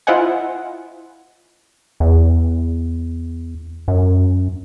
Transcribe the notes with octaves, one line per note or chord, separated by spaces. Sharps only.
E4 F4 C5 D#5 F#5 G#5
E2
F#2